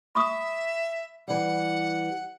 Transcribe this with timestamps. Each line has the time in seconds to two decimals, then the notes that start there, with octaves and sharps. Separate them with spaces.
0.15 E5 B5 C#6 D#6
1.28 E3 G3 F#5